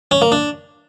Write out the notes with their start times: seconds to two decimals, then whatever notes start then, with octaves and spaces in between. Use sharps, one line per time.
0.11 C#4
0.22 A#3
0.32 D4